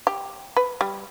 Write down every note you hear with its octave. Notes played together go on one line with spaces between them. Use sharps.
G4
B4
G3